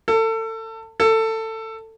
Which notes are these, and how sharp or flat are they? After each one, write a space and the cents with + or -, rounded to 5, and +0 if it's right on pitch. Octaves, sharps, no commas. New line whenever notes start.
A4 +30
A4 +20